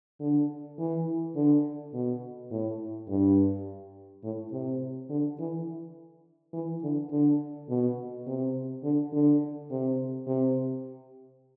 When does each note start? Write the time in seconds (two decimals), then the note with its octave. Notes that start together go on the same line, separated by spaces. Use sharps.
0.20 D3
0.79 E3
1.36 D3
1.94 B2
2.51 A2
3.09 G2
4.23 A2
4.52 C3
5.10 D3
5.39 E3
6.53 E3
6.83 D3
7.11 D3
7.69 B2
8.27 C3
8.84 D3
9.13 D3
9.71 C3
10.27 C3